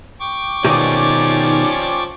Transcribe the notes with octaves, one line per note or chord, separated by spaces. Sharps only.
G5 C#6 D6
B2 D#3 F3 C#4 D#4 G4 D5